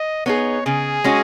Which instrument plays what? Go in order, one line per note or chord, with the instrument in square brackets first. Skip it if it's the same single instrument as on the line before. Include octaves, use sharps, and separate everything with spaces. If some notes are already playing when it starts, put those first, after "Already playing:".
Already playing: [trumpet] D#5
[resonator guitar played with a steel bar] B3 D#4 G#4 [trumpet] C#5
[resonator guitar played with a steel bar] C#3 [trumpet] G#4
[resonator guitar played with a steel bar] G#3 C#4 F#4